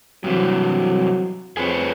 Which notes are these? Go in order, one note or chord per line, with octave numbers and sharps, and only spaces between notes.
G2 C3 E3 F#3
F2 G#4 B4 C#5